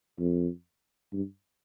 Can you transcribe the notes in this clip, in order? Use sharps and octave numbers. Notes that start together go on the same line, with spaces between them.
F2
G2